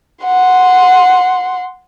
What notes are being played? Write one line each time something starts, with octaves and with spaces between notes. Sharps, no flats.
F#5 C6